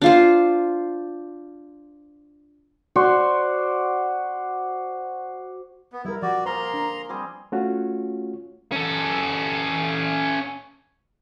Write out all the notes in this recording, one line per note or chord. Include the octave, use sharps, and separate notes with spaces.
D4 F4 C5
F#4 C5 D5 C#6
B3
G3 E4 A#4
F3 F#4 D5
A#3 G#4 A#4 C5 A#5 C6
D4
G3 C4 G#4
A3 C#4 F4 F#4 C#5
C#4 A4